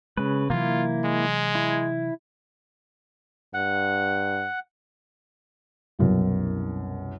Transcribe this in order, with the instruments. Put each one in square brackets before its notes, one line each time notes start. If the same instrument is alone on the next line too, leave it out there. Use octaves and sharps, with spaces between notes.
[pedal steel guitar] C#3 B4 [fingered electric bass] G#3
[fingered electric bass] C3 E3 F#3 [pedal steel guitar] A#3 E4 [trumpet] F4
[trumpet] G#3
[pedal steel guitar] E4
[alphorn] G2 [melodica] F#5
[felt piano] C2 F#2 B2